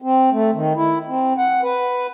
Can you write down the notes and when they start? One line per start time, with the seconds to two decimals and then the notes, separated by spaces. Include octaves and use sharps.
0.02 C4
0.32 A3
0.54 D#3
0.76 E4
1.08 C4
1.38 F#5
1.63 B4